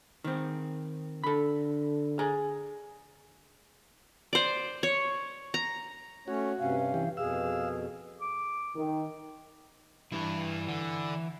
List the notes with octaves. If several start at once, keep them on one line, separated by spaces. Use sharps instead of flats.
D#3 C4
D3 A4 B5
G#4 A#5
C5 D5
C#5
A#5
A3 C#4 F#4 C#5
G2 C3 C#4 F5
E3 G4
F2 B2 G#4 F5 E6
D6
D#3
G2 E3 E4
D3